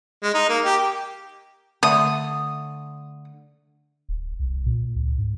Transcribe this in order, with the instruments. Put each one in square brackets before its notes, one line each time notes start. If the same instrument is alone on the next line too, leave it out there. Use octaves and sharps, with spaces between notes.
[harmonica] G#3
D#4
A#3
G4
[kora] D3 A3 [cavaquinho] D#6
[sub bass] D1
C2
A#2
C#2
G#2